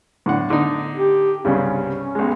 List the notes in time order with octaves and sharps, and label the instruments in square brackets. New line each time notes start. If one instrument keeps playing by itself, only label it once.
[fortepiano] A2 D3 F#5
D3 D#4
[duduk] G4
[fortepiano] C2 G2 C#3 [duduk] C#4
[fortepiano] B1 G#3